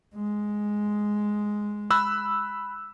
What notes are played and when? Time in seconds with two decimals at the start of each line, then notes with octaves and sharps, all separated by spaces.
0.16 G#3
1.91 B5 E6 F#6